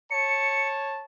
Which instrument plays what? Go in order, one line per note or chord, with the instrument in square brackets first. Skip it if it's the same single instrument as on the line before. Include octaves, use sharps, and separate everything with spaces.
[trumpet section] C#5 A5 [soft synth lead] C#7